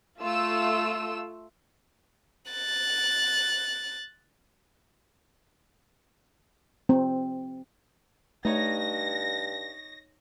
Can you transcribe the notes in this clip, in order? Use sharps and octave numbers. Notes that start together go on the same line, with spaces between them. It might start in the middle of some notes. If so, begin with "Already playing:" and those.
A3 F4 E6
F#6 A6
C4
G2 A3 D#4 C#5 A#6